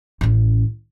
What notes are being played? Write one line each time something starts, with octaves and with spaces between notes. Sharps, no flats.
A1 C#4